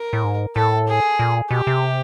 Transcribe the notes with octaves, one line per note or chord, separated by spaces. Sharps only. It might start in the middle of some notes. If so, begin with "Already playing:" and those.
Already playing: A#4
A2
G#2
A2 A4
G#4
A#2
B2 G4
C3